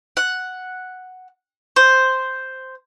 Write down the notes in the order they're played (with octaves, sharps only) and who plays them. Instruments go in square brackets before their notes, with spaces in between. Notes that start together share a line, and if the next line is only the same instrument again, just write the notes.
[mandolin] F#5
C5